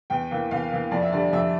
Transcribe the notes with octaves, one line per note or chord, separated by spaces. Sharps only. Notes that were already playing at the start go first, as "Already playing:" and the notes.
E2 G5
E3 A#3
E2 F5
E3 A#3
F2 D5
E5
D3 G3 D5
F2 E5